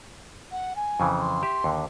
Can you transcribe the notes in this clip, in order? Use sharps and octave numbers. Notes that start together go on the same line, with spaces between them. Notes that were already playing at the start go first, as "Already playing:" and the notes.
F#5
G#5
F2 C#3 E3
C6
G4 E5
D#2 D3